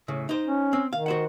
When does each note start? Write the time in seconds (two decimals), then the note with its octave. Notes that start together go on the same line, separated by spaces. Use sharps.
0.08 A2 C#3
0.29 D#4 C5
0.45 C#4
0.73 C4
0.93 D#3 F5
1.06 F#4 C5 F#5